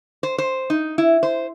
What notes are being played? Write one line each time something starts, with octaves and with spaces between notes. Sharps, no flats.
C5
C5
D#4
E4
C5